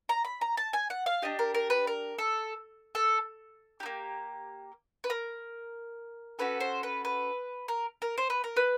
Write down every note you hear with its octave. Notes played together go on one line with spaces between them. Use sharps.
A#5
B5
A#5
A5
G#5
F#5
F5
D4 G4 D#5
A#4
A#4
B4
A#4
A4
A4
D#4 G4
A#3
B4
A#4
C#4 F#4 A4 B4
C5
B4
B4
A#4
A#4
C5
B4
A#4
B4